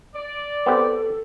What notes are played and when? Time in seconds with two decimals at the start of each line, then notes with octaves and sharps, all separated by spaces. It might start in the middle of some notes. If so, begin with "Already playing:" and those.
0.15 D5
0.66 B3 C4 G4 A4